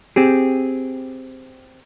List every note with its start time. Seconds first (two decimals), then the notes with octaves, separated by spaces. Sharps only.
0.16 C4 G4 G#4